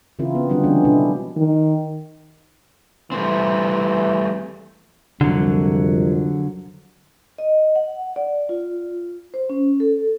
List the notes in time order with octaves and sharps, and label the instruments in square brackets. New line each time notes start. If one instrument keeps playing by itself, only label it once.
[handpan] C#3 E3 C4 E4 F4 A#4
B3
D3 F#3 G3 C4 D4 D#4
D3 E3 F3 G#3 C#4
B2 D4 E4
[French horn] D#3
[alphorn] E3 [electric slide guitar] G3 A3 C4
[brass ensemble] C2 F2 [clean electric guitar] D3 F#3
[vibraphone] D#5
F#5
D5
F4
C5
C#4
A4